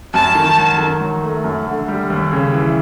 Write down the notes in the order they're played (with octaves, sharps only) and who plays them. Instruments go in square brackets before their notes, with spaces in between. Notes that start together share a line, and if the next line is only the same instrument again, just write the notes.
[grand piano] F#2 [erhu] A5
[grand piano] D#3
F#3
D#3
F#3
A3
F#2
D3
G3
D#2
C#3
E3